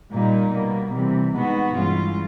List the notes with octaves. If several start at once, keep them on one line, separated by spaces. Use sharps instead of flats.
A#2 G3 A#3 D#4
B2 G3 A#3
C3 E3 G3
B2 G#3 B3 D#4 F#4
G2 E3 G#3 C#4 F4